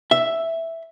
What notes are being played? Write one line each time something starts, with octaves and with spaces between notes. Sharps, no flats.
E5